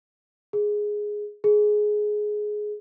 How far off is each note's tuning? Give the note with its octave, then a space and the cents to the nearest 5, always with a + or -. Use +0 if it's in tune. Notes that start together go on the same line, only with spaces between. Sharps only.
G#4 +5
G#4 +15